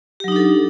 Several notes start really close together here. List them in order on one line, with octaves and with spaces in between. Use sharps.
G4 F#3 D#4 D4 A4